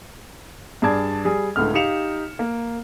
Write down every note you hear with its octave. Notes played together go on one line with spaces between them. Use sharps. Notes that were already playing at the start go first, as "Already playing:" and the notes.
G2 G#4 D5 A5 G#6
G3 G#4
C#2 A2 D3 F6
D#4 G4 F5 C#7 E7 F7
A#3